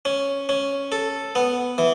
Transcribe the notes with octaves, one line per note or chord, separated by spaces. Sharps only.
C#4
C#4
A4
B3
E3